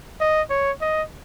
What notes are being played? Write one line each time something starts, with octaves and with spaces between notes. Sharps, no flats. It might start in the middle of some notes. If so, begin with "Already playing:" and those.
D#5
C#5
D#5